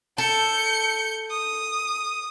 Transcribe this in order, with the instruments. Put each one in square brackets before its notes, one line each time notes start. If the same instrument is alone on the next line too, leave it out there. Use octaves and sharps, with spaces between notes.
[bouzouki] A4 [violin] G6 C#7
[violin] D#6